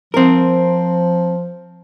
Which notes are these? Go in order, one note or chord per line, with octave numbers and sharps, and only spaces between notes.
F3 C4 A#4